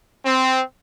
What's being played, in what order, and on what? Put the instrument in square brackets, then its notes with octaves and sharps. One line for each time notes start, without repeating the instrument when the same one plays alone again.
[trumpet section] C4